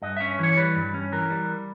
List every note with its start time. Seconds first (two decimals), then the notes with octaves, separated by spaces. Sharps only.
0.02 G2 D#5
0.17 C#4 E5
0.39 E3 C#5
0.57 G3 B4
0.76 G2
0.94 C#4
1.12 E3 A#4
1.30 G3